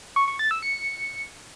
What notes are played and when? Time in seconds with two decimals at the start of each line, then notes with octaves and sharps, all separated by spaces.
0.16 C#6
0.28 C#6
0.39 A6
0.51 E6
0.62 C#7